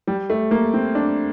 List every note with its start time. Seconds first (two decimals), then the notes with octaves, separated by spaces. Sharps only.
0.07 G3
0.30 A3
0.51 A#3
0.74 C4
0.95 D4